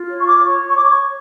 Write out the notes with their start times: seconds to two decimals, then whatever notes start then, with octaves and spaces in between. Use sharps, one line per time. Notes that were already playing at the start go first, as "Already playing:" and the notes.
Already playing: F4
0.10 C#5
0.19 C#6
0.27 D6
0.44 C#5 C#6
0.68 C#6
0.75 D6
0.79 C#5 C#6
0.91 C#6